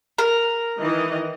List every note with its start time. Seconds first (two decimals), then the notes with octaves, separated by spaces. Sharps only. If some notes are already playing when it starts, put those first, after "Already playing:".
0.18 A#4
0.77 D#3 E3 D#5